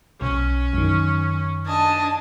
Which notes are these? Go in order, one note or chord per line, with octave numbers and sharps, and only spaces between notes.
B1 C#4
F#2 D#3
D4 D#5 G#5 A5